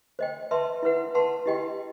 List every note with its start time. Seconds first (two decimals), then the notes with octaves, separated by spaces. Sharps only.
0.19 C5 D#5 G5
0.51 B4 E5 A5 C6
0.83 E4 B4 F#5
1.15 B4 F#5 A5 C6
1.46 E4 G4 D#5 G5